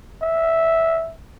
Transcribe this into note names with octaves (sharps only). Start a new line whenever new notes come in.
E5